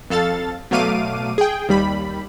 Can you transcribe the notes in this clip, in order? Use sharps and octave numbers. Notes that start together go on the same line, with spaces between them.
F2 A4 F5 A6
B2 F#3 A3 F5 D6 D#7
G#4 G5
D#2 G3 B5